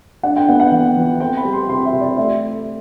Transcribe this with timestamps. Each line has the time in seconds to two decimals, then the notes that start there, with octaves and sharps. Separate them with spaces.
0.23 D4 F#5
0.36 G5
0.49 B3 F#5
0.60 F#5
0.72 E3
0.97 E3
1.20 C4 G5
1.37 B5
1.45 G3
1.53 C6
1.69 C3 C6
1.85 E5
1.93 C3
2.00 D5
2.17 A3 E5